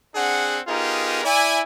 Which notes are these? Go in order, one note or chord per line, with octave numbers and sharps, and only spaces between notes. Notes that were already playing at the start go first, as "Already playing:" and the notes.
C4 D4 G#4 F#5
B3 D#4 F4 G4 G#4 A#4
E4 D5 G#5